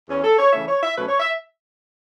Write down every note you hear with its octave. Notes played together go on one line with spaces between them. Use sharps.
E2 E3 C#4
A4
C#5
C#3 E3 A3 C#4 E5
C#5
E5
B2 F#3 A3 C#4 B4
C#5
E5